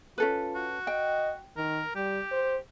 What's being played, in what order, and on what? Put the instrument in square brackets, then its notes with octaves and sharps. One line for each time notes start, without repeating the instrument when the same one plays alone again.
[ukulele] C#4 A4 B4 [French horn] F4
[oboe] F#4
[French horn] D#5 [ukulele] G5
[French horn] D#3 [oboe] A#4
[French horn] G3 [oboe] G4
[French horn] C5